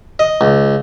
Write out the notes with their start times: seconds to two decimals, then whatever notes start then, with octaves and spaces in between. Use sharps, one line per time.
0.19 D#5
0.41 C#2